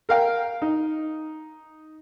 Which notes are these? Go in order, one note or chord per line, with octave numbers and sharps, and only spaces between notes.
A#4 F5 G5
D#4